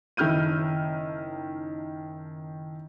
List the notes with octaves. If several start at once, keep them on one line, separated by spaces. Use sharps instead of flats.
F#1 D#3 E4 F6 G6 D#7